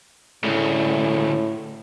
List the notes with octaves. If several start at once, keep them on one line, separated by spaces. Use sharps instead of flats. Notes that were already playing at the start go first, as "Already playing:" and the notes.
D2 A2 C#3